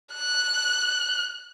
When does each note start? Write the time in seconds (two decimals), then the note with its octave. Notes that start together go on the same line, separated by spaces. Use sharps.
0.14 F#6